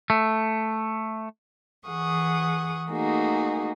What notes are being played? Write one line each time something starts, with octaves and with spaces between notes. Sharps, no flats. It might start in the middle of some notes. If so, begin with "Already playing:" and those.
A3
E3 G#4 F#5 C#6 D#6
A3 A#3 D#4 F#4 G#4